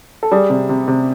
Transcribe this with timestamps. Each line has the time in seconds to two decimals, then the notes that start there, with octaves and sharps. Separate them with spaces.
0.23 A4
0.31 G3 G#4
0.50 C3
0.69 C3
0.88 C3